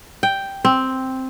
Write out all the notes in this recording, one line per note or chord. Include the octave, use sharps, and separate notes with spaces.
G5
C4